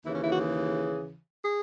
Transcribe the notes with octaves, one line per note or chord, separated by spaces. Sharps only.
D#2 C#3 E3 E4
C#4
E4
F#4
G#4
G#4